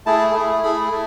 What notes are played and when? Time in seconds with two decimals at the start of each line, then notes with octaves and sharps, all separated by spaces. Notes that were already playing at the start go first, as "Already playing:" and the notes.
0.06 A3 E4 G#4 A5
0.34 A3 E4 G#4
0.63 A3 E4 G#4 B5
0.92 A3